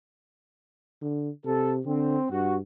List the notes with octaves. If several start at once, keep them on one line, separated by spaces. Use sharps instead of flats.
D3
C3 A4
D3 C4
G2 F#4